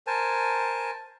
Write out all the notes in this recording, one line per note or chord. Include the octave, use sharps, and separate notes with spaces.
A#4 C5 G#5 A5